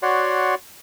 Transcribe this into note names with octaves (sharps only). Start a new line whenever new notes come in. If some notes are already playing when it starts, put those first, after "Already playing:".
F#4 C#5 D5 F#5 C6